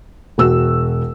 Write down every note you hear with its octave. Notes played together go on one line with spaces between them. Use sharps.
E1 F#4 E6